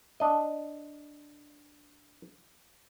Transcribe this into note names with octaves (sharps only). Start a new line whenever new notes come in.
D4 D#5